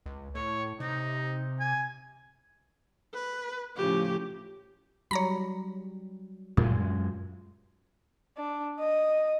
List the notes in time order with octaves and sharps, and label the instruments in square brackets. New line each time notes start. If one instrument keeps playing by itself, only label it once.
[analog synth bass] C#2
[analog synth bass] A2 [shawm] C#5
[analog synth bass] C3 [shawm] D#4
[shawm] G#5
[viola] B4
[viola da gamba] A2 C#3 F3 [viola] G4
[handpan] F#3 G3 [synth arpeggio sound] C#5 A#5 B5
[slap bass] F#2 G#3 [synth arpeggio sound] A#2 [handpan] F4
[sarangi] D4
D#5